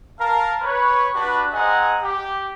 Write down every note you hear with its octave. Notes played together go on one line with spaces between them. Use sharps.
A#4 F5 A5
B4 C#5
D4 F#4 G4 B4
C4 G#4 D#5 F#5 G#5 A#5
G4